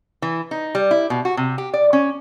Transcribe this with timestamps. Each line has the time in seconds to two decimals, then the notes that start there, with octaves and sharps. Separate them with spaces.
0.22 E3
0.51 D#4
0.75 G3
0.91 E4
1.10 B2
1.25 F#4
1.37 C3
1.58 G4
1.74 D5
1.93 C#4